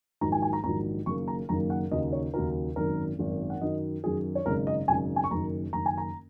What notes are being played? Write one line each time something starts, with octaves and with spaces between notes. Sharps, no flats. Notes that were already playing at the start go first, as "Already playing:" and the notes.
A#1 G#2 D#3 F#3 A#5
G#5
G#5
A#5
A#1 G#2 D#3 F#3 A#5
F#1 F#2 D#3 A#3 C#6
A#5
F#1 F#2 D#3 A#3 A#5
F#5
D#2 C#3 F#3 D#4 D#5
C#5
D#2 C#3 F#3 D#4 A#4
G#1 F#2 D#3 A#4
G#1 F#2 D#3
F#5
F#2 D#3 F#3 D#5
F#2 D#3 F#3 G#4
C#5
G#1 F#2 C#3 G#3 D#4 A#4
D#5
G#1 F#2 C#3 G#3 D#4 G#5
G#5
C#6
F#1 F#2 D#3 A#5
F#1 F#2 D#3 A#5
G#5
A#5